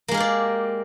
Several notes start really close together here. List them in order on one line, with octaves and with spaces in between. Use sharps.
A#3 G#3 A#4 G4 D5